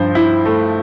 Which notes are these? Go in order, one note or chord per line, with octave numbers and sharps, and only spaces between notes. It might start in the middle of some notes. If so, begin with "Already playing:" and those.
Already playing: G2 F3 C5
E4
A3